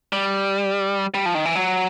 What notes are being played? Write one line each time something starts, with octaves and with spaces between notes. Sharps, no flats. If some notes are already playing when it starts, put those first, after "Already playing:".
G3
G3
F3
D#3
E3
F#3